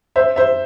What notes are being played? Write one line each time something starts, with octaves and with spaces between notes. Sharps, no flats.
C5 E5
C5 E5